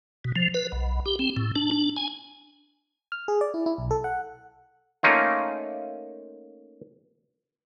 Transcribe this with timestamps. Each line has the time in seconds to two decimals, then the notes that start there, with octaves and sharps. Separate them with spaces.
0.25 B2
0.36 F3
0.54 B4
0.72 B1
1.06 G4
1.19 C4
1.37 A2
1.56 D4
1.71 D4
1.97 G#5
3.12 F6
3.28 G#4
3.41 D5
3.54 E4
3.66 E4
3.78 B1
3.91 A4
4.04 F#5
5.03 A3 A#3 C#4 D#4 F4